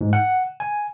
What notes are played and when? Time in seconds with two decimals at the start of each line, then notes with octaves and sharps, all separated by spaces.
0.01 G#2
0.13 F#5
0.60 G#5